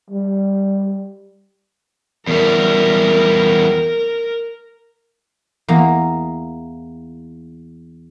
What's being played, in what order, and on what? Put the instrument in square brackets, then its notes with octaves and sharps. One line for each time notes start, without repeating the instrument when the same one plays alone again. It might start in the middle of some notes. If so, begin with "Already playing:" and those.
[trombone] G3
[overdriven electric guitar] E2 G3 [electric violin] A#4
[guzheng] E2 A#3